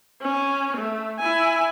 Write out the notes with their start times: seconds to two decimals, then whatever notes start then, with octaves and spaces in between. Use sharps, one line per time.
0.22 C#4
0.77 A3
1.19 E4 G#5